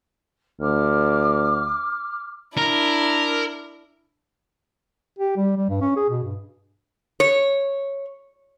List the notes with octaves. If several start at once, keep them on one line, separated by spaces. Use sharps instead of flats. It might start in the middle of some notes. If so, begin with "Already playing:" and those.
D2 D6 F6
D4 E4 A#4
G4
G3
G3
G2
C#4
G#4
B2
G2
C#5